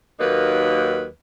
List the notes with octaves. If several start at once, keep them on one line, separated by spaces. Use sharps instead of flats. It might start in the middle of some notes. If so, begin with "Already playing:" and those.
D#2 F#3 A#3 D#4 B4